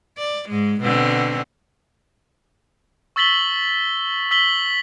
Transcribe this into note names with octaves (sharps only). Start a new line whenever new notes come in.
D5
G#2 G#3
B2 D3 C4
C#6 E6 A6 B6 F#7 G7
E6 B6 F#7 G7